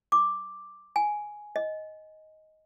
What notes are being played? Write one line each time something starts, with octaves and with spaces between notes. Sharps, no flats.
D6
G#5
D#5